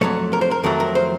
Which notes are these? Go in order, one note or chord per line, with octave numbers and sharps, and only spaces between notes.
F2 D#3 F#3 A3 C#5
A#4
C5
A#4
F2 D#3 F#3 A3 A#4
A#4
C5